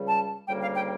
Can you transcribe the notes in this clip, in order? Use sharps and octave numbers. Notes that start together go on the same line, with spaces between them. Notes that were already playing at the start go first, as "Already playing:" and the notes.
Already playing: C#2 C#3 G3
A5
D2 C#3 G3 A#3 G5
F5
G5